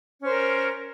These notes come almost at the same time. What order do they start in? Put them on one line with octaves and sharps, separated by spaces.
C#4 C5 A#4